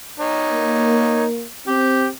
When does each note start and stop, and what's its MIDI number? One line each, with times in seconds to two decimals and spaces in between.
0.19 1.23 63
0.19 1.23 73
0.51 1.46 58
1.67 2.10 60
1.67 2.06 67